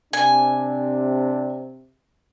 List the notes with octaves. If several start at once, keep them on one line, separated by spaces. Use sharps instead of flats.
C3 D4 G#5